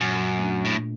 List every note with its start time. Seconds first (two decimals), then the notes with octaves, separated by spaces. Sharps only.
0.01 F#2 A#2
0.38 A3 D4
0.65 A2
0.76 A#2